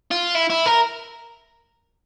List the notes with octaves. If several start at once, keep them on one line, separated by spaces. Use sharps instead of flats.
F4
E4
E4
A#4